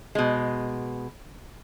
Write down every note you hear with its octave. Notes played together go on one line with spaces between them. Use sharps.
B2 G#3